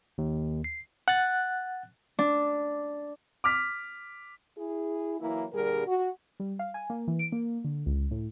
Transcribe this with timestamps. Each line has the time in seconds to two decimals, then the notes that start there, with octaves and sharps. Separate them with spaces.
0.18 D#2
0.64 C7
1.08 F#5 F#6 A6
2.19 D4
3.44 D6 F6 B6
4.57 E4 G#4
5.21 E3 F#3 A#3 E4
5.53 G2 A#2 D3 G3 G#4 A#4
5.87 F#4
6.40 G3
6.59 F5
6.74 G#5
6.90 A#3
7.08 E3
7.19 D7
7.32 A#3
7.64 D3
7.86 C#2
8.11 A2